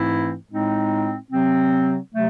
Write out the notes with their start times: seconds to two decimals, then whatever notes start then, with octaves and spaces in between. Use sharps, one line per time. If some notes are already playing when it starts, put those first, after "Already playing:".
Already playing: G#2 E3 A3 C4 E4
0.50 A2 G#3 C4 D#4
1.31 C3 F#3 C4
2.13 C3 F#3 A3